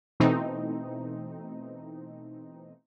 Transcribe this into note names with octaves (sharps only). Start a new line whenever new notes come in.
B2 E3 A3 C4 D#4